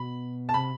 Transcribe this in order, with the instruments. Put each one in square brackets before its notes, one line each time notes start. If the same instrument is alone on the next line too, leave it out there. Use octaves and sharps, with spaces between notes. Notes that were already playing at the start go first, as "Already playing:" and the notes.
Already playing: [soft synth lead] B2 [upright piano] B5
[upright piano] A5
[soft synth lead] C3 [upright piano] B5